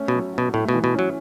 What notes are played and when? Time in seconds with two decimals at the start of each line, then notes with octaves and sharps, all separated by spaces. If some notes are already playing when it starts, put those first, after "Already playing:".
Already playing: A3 C#4
0.08 B2
0.14 F#3
0.33 B2 F#4
0.54 A2 A3
0.68 B2
0.74 E3
0.84 B2
0.94 F#3 C#4